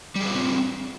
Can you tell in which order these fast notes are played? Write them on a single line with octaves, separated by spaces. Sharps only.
G3 G#4 B4 F4 C4